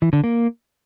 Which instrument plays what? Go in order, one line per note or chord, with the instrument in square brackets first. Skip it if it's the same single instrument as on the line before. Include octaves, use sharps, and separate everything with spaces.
[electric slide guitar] E3
D3
A#3